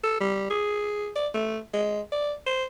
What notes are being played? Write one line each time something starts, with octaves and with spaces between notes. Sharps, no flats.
A4
G3
G#4
D5
A3
G#3
D5
C5